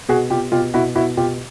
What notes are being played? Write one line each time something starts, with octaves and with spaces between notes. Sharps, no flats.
B2 F#4 G#4
B2 F4 G4
B2 F4 G4
B2 E4 F#4
B2 E4 F#4
B2 F4 G4